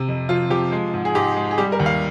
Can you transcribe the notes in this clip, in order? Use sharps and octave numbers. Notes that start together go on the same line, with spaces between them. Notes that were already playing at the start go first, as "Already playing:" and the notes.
Already playing: C3
F2
F3 F4
F3 G4
G#3
G#2
G#4
G#2 G4
G#3
G#4
G3 G4
A#4
D#2
F5